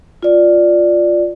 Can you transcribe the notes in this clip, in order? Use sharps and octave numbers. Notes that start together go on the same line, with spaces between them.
F4 D5